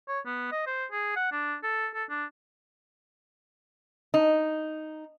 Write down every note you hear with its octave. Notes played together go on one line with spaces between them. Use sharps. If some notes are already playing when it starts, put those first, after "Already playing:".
C#5
B3
D#5
C5
G#4
F#5
D4
A4
A4
D4
D#4